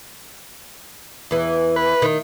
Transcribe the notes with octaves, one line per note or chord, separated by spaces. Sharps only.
E2 E3
B4
D#3